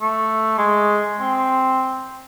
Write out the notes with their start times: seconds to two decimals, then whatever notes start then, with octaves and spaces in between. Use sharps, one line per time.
0.02 A3
0.58 G#3
1.20 C4